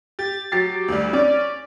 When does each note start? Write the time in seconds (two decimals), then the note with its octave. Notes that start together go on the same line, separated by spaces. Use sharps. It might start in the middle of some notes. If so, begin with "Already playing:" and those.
0.19 G4 A6
0.52 F#3 G4 A6 C7
0.88 D2 G3
1.13 C#4 D5